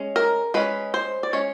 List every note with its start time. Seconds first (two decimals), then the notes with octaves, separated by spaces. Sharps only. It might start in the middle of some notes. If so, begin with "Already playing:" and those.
Already playing: G#3 C#4
0.16 A#4
0.54 G#3 C#4 B4
0.94 C5
1.23 D5
1.33 G#3 C#4 C#5